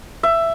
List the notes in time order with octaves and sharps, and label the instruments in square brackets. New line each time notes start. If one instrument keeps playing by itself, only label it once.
[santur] E5